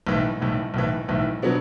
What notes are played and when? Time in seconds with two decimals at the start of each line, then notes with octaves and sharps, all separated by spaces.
0.07 B1 A2 E3
0.40 B1 A2 E3
0.74 B1 A2 E3
1.08 B1 A2 E3
1.42 B2 F#3 B3 D4